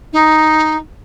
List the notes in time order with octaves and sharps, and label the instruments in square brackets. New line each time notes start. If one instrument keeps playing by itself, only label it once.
[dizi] D#4